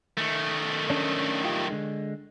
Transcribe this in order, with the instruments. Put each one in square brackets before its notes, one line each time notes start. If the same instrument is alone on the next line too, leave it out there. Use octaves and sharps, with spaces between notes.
[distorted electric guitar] D#3 A3
[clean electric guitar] C#4 D4
F4 G4
D3 G#3